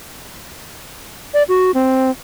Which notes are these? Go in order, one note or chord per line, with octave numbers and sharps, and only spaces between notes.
D5
F#4
C4